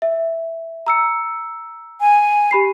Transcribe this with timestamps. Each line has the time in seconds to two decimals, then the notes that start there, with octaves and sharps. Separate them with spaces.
0.02 E5
0.86 A#5 E6 C#7
2.01 G#5
2.51 G4 B5 C7